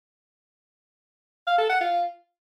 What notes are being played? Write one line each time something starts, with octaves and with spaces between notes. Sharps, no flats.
F5
A4
F#5
F4